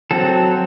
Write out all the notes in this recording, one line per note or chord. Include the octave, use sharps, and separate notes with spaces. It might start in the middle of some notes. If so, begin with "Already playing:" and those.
F#3 C4 A4